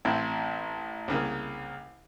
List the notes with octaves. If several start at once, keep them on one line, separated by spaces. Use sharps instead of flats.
A1 C4 E4
C2 C#3 A#3